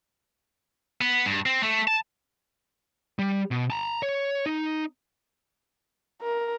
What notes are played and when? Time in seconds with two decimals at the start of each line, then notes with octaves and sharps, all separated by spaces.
1.01 B3
1.26 G2
1.46 C4
1.63 A3
1.88 A5
3.19 G3
3.51 B2
3.70 A5 A#5
4.03 C#5
4.46 D#4
6.23 A#4